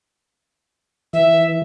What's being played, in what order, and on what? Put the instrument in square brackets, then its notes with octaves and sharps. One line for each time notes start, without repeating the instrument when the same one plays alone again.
[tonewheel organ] E3 [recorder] E5